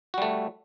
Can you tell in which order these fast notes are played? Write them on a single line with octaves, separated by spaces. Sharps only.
F#4 G3 A3